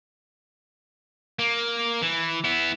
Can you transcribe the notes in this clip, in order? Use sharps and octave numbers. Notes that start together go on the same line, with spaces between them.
A#3
E3
B3 E4